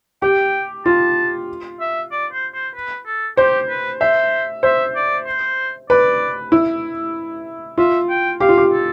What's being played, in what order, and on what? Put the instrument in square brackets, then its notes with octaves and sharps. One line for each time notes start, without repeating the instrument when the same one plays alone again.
[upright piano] G4 [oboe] G5
[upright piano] F4 [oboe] A5
[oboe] E5
D5
C5
C5
B4
A4
[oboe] G4 [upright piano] C5
[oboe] B4
[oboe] C5 [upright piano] E5
[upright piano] C5 [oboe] E5
[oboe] D5
C5
[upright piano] B4 [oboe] D5
[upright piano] E4
[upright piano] F4 [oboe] E5
[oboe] G5
[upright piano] G4 [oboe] F5
[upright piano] F4
G4
[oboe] A4